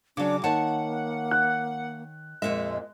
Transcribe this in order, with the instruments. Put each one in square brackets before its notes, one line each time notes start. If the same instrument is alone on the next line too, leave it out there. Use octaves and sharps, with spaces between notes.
[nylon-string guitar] C#3 F#3 [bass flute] D4 [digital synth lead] D6
[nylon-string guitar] D#3 C#5 A5 [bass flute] A#3 [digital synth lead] F#5
[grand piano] F#6
[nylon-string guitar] F2 A#2 E5 [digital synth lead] G#3